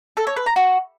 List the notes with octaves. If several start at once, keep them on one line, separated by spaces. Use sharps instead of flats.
A4
C#5
B4
A#5
F#4